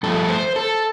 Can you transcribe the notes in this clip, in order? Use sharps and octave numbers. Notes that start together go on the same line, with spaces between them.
G2 F3 A3 A4
C5
A4